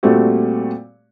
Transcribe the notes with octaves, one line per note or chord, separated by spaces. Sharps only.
A#2 G3 A3 C4 F#4